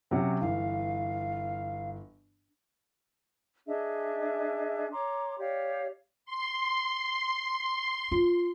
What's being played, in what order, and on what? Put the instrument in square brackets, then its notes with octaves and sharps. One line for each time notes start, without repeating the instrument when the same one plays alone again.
[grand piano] C3 F#3 C#4 [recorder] F#5
[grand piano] G1 E3 [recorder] F5
[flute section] D4 G#4 D#5 E5
C#5 A#5 C6 D6
G4 C#5 D5 F5
[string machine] C6
[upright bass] F4